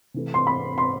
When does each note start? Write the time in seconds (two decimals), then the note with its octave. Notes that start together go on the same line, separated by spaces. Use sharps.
0.14 C3 E3 A3
0.34 C6
0.47 B5
0.78 C6